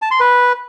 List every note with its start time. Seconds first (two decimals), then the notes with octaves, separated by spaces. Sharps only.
0.02 A5
0.11 C6
0.20 B4